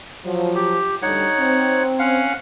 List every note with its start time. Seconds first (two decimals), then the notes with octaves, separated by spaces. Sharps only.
0.25 F3 F#3
0.55 G4
1.02 D2 D3 G3 D#4 C#5 F#5
1.37 C4
1.99 C#4 F5 F#5